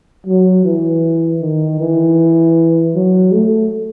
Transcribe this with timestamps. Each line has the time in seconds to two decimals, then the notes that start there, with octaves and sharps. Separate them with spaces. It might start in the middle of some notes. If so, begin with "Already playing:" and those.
0.26 F#3
0.65 E3
1.41 D#3
1.80 E3
2.95 F#3
3.32 A3